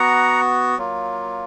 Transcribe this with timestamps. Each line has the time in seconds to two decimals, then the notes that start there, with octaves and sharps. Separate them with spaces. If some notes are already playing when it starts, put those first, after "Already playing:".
Already playing: B3 F#4 F#5 A#5
0.78 F#3 A#3 F4